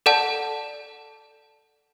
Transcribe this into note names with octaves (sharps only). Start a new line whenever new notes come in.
A4 D5 F#5 A5